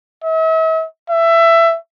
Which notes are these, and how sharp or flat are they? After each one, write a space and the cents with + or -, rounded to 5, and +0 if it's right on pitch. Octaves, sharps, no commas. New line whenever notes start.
E5 -45
E5 +20